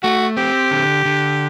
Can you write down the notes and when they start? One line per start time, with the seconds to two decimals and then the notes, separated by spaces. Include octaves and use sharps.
0.03 A3 F#4
0.37 C4 G4
0.71 D3
1.05 D3